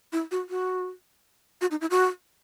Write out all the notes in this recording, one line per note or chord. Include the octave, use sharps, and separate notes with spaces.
E4
F#4
F#4
F#4
D#4
E4
F#4